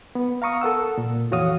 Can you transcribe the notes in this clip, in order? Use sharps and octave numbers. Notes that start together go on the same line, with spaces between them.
B3
F5 A#5 C#6 D#6
A4 A#4 F#5 E6
A#2
F2 E3 F#4 C#5 F5 D#6